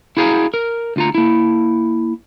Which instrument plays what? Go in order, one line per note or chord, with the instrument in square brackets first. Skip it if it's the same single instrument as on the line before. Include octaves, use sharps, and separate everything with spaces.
[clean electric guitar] E4 F#4 G#4 F5 A#5
A#4
D2 F4 A#5
A#3 E4